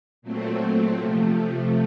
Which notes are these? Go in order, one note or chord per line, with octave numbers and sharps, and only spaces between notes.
A#2 F#3 A3 C4
C3 F3 A3